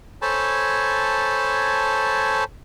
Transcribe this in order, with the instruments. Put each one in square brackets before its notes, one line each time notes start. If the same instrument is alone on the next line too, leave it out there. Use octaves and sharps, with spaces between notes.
[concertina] A4 C5 C#5 G#5 A5 B5